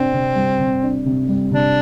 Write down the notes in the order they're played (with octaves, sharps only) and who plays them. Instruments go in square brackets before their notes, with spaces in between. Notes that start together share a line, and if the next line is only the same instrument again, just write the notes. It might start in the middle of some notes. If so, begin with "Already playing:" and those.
Already playing: [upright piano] C3 D4 [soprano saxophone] C4
[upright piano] C3
G3
C3
D4
C3
G3
[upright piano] C3 [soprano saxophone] D4